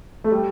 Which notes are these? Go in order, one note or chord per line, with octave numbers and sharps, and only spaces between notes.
A3
G3